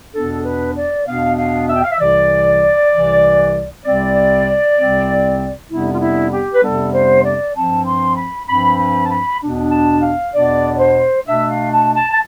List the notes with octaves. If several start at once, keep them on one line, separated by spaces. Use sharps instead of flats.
E2 B2 B3 D4 A4
B4
D5
E2 B2 B3 D4 F5
F5
E5
G5
F5
E5
C2 C3 E3 D5
C2 C3 E3
C2 C3 G3 C4 D5
C2 C3 G3 C4
F2 C3 G3 B3 D4 E4
F4
E4
G4
B4
F2 C3 G3 B3 D4 A4
C5
D5
G2 F3 C4 A5
C6
B5
G2 F3 C4 B5
B5
A5
B5
E2 B2 B3 D4
A5
F5
E2 B2 B3 D4 D5
D5
C5
B2 A3 D4 E5
F5
A5
A5
A5